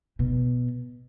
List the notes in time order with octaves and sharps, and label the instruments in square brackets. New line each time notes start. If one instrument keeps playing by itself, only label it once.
[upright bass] B2